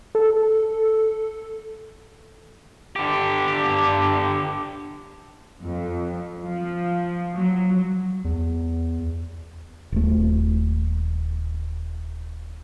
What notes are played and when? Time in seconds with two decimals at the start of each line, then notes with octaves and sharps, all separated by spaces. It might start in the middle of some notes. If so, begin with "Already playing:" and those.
0.15 A4
2.96 D3 G4
5.62 F2
6.41 F3
7.34 F#3
8.25 E2
9.92 D#1 A3